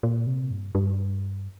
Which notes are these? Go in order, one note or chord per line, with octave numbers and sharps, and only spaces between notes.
A#2
C3
G2
G2